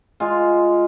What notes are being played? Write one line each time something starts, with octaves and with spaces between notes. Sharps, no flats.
G#3 F4